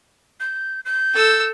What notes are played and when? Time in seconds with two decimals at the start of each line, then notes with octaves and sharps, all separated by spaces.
0.40 G6
0.85 G6
1.14 A4 E6